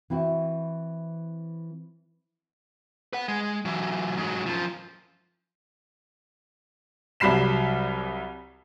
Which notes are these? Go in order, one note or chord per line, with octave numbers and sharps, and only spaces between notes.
E3 C4 E4 F#4
B4 F#5
G#3
E3 F#3
G#2 F#3
F#2 F3
C2 F#3 G3 B5 C7 E7